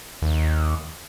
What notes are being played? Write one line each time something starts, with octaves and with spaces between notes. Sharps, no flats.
D#2